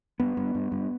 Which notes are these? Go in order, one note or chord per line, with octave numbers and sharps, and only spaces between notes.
G2 B3
G2
G2
G2